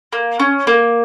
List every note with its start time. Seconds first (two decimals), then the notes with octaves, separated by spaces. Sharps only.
0.13 A#3
0.40 C#4
0.67 A#3